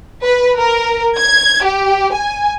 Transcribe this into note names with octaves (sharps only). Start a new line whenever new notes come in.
B4
A#4
G#6
G4
G#5